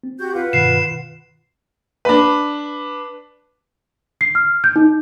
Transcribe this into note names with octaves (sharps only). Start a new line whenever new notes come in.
C4
F#4 G4 G6
F4 B4 F#5
G2 B2 D#3 C7 E7
D4 B4
C7
F6
G6
D#4